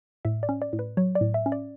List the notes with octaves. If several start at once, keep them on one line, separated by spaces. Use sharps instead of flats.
A2 E5
D5
C#4
D5
A2
B4
F#3 C#5
D5
A2
E5
C#4
D5